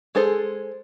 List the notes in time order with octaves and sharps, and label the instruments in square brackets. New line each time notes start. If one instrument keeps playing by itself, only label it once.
[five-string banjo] G#3 G#4 A4 C5